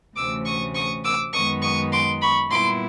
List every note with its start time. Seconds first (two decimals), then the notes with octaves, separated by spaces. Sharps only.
0.16 D2 C3 E3 A3 C#4 D6 E6
0.46 C#6 D#6
0.75 C#6 D#6
1.04 D6 E6
1.34 F#2 D#3 G#3 B3 D#4 C#6 D#6
1.63 C#6 D#6
1.92 C6 D6
2.22 B5 C#6
2.51 A#2 G3 B3 E4 C6 D6